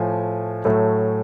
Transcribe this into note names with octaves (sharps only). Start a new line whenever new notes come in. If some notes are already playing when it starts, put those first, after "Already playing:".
Already playing: A2 F3 A3 G#5
A2 F#3 A3